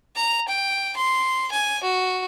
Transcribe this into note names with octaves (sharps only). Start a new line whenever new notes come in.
A#5
G5
C6
G#5
F#4